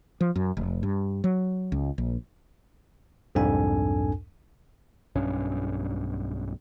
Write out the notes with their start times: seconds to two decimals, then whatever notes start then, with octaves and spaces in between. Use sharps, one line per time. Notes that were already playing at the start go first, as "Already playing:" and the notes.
0.21 F3
0.36 F#2
0.57 F1
0.83 G2
1.24 F#3
1.72 C#2
1.98 A#1
3.35 C2 F2 G#2 D4 A4 G#5
5.16 B1 G2 C#4